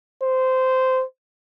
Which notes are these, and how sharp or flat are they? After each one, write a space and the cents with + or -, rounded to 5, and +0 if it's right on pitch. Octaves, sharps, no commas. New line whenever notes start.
C5 -15